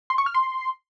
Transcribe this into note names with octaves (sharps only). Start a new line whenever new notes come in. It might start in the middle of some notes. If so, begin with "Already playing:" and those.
C6
C#6
F6
C6